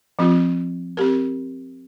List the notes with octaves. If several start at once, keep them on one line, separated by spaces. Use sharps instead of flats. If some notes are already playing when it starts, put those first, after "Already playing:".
F3 C4 F4
C4 G4 A#4